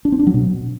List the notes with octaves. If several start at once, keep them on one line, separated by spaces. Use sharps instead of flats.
D4
C4
D4
F#3
B2